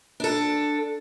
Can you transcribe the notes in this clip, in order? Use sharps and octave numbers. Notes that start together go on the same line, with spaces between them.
D4 A4